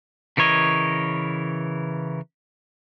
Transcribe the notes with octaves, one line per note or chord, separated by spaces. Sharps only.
C#3 E3 A#4 C#5 D#5